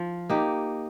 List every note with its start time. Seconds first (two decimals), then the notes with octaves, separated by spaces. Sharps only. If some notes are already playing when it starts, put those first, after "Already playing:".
Already playing: F3
0.30 A#3 D#4 G4